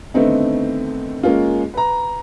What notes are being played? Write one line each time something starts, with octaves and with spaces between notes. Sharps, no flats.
D3 D#3 A3 B3 C4 D#4
G#3 A#3 C#4 F4
B4 A#5